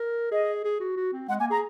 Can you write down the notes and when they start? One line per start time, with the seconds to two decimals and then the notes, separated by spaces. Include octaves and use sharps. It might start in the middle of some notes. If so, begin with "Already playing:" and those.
Already playing: A#4
0.32 G#4 D#5
0.65 G#4
0.80 F#4
0.97 F#4
1.13 C4
1.29 G#3 F#5
1.40 A#3 G#5
1.50 G#4 A#5